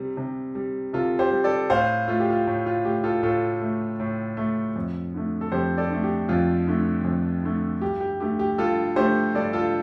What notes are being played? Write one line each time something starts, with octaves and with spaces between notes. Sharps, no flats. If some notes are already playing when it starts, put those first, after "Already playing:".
Already playing: C3 G3
C3
G3
C3 F4 A4
G4 C5
G3
A4 D5
A2 C5 F5
A3 F4
G4
F4
A2
F4
A3 G4
F4 A4
A2 F4 A4
A3
A2
A3
F2
D3 A3
A4
F2 G4 C5
A4 D5
D3 A3
G4
F2 F4
D3 A3
F2
D3 A3
G2 G4
G4
D3 A3 G4
G4
G2 F4 A4
D3 A3 G4 C5
G2 A4 D5
F4 A4